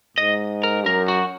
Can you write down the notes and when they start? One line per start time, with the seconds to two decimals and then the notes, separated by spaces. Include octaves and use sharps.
0.17 G#2 D#5
0.63 A#4
0.86 F#2 A#4
1.08 F#4